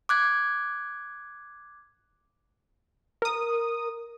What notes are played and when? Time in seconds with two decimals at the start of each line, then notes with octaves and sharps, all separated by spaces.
0.09 D6 F#6 G#6
3.22 A#4 D#6